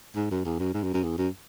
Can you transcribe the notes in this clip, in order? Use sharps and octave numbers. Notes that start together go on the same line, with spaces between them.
G#2
F#2
E2
F#2
G#2
F#2
F#2
E2
F#2